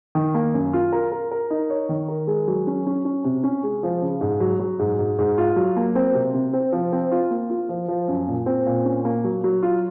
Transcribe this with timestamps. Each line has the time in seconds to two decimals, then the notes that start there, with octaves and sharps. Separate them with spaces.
0.15 D#3
0.34 A#3
0.54 F#2
0.73 F4
0.92 A#4
1.12 A#4
1.31 A#4
1.51 D#4
1.70 C#5
1.89 D#3
2.08 A#4
2.27 G#3
2.48 F#3
2.67 C#4
2.87 C#4
3.05 C#4
3.24 C3
3.44 C#4
3.63 G#3
3.83 F3
4.02 C#3
4.21 G#2
4.40 F#3
4.60 F#3
4.79 G#2
4.99 G#2
5.19 G#2
5.38 F4
5.56 F#3
5.76 A#3
5.95 C4
6.14 C3
6.34 C3
6.53 C4
6.73 F3
6.93 C4
7.12 F4
7.31 A#3
7.50 F4
7.69 F3
7.88 F3
8.08 F#2
8.28 A#2
8.46 C4
8.66 A#2
8.85 C#4
9.05 A#3
9.24 F#3
9.44 F#3
9.63 F4